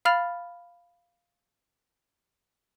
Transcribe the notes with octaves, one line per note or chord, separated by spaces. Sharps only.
F5 B5 F6 A6 F7